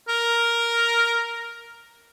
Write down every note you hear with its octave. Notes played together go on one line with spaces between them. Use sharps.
A#4